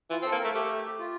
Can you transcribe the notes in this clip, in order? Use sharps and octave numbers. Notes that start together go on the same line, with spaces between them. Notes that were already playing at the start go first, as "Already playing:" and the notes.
E3 F4
C4
A4
A#3
A3 A#4
A3 G4
F4